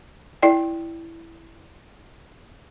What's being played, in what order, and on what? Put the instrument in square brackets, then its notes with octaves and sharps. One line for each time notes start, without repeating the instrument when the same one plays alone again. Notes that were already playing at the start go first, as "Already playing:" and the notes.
[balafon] E4 D5 G5